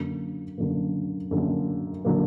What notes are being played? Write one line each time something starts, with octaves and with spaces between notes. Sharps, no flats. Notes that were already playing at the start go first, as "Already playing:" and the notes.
Already playing: F#2 D3 F#3 A#3
F#2 D3 F#3 A#3
F#2 D3 F#3 A#3
D3 F#3 A#3